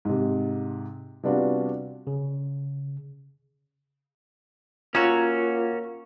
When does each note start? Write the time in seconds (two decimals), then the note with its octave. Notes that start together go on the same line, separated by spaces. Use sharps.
0.05 G#2 C3
1.23 C3 G3 B3 D4 F4 F#4
2.07 C#3
4.95 A#3 C#4 F4 F#4 C#5 A#5 E6